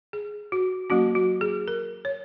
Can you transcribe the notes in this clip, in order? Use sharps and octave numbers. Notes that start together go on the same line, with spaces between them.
G#4
F#4
F#3 A#3 C#4 F#4
F#4
G#4
A#4
C#5